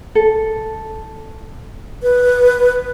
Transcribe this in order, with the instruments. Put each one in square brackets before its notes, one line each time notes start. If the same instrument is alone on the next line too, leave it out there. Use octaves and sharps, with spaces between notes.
[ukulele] A4
[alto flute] B4